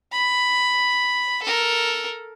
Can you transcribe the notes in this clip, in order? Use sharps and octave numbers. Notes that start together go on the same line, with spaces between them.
B5
A4 A#4